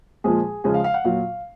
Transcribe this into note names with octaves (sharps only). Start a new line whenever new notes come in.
A#2 F3 G#3 G#4
C#3 F3 G#3 G#4
F5
F5
F#5
A#2 F#3 F5